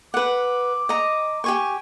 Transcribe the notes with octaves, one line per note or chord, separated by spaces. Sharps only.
B4 F#5 D6
D#5 A#5
G4 G#5 C#6